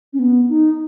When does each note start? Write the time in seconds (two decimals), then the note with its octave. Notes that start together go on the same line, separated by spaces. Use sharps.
0.13 C#4
0.19 B3
0.49 D#4